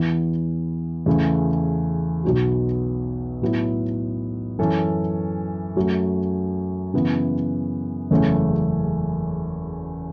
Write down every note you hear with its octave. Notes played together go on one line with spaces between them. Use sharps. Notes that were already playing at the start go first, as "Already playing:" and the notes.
Already playing: E2 E3 B3
E2 C#3 A3
B1 B2 F#3 B3 F#4
A2 F#3 B3 E4
F#2 E3 C#4 A4
F#2 F#3 A3
F#2 C#3 E3 B3
F#1 E2 C#3 A3 C#4